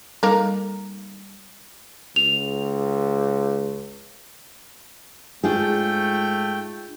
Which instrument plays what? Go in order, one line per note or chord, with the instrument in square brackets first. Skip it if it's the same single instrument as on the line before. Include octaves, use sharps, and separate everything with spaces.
[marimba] G3 A4 [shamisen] A#3 D#4 A#4
[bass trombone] C#2 [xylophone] F7
[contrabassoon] G#2 [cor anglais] A3 [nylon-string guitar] D4 F4 G#4 [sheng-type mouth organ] G5